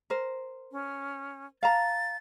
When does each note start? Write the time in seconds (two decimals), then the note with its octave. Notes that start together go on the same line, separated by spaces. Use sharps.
0.10 A#4 C5
0.72 C#4
1.63 F5 A5 A#5 A6